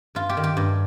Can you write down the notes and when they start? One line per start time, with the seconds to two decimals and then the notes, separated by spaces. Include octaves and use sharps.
0.15 G2 F4
0.29 G4
0.37 D#3
0.44 G4
0.57 G2